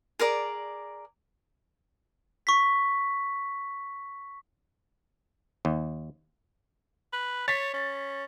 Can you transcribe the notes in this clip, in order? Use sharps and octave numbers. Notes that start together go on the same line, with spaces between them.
G#4 A#4 D5
C#6 B6
D#2
B4
C#5 A6 B6
C#4